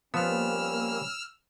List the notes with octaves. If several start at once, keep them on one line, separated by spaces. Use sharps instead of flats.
F3 G3 A#3 B3 C#4 E6 F6